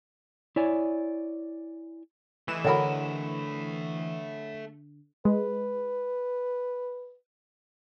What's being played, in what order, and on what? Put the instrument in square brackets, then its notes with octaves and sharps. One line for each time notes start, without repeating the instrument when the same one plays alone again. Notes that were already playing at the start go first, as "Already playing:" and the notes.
[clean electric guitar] E4 C#5 D5 G#5
[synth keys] E3 E7 [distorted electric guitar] A3 D#5
[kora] D3 A#4 [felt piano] C#5 F#5 B5
[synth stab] G#3 [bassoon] B4